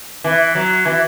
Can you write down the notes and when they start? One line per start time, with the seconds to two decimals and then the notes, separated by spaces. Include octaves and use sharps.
0.24 E3
0.55 F#3
0.86 E3